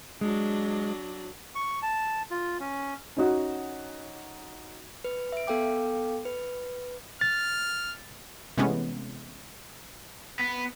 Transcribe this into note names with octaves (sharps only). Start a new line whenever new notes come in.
F#3 G#3 D4
C#6
A5
F4
C#4
C#4 D#4 F#4
B4
E5 D7
B3 A4 F5 G5 D6
B4
F6 A6
C3 E3 G#3 A3 B3 C#4
B3